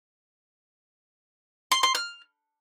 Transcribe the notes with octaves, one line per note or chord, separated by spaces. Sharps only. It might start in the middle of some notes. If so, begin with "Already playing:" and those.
C6
C6
F6